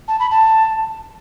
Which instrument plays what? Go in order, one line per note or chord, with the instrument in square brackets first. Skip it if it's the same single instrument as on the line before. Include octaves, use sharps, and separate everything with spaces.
[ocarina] A5
B5
A5